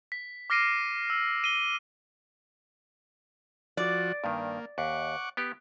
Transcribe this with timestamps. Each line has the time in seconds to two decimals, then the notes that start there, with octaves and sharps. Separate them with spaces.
0.12 B6
0.50 D6 F6 A#6 C7 D7 D#7
1.10 E6
1.44 D#7 G7
3.77 F3 F#4 D5
4.24 G2 D#3 A#3
4.78 D#2 F#5 C#6 D6
5.37 B3 G4